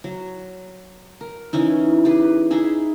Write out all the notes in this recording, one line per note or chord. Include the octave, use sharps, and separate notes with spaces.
F#3
A#4
E3 C#4 D#4 E4
G4 G#4 B4
D#4 E4 G#4 E5